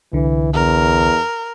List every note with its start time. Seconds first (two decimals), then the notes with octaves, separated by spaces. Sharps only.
0.13 C2 D3 E3
0.54 E2 A#4